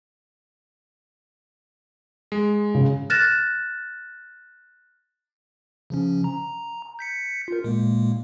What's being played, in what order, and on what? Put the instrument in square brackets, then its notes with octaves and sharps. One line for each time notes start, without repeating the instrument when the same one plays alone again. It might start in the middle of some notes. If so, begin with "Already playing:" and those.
[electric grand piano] G#3
[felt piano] C#3
[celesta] F6 F#6 A6 A#6 E7
[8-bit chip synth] C#3 F3 C#4
A#5
G6 B6 C#7
F4 A#4
A#2 G#3 A#3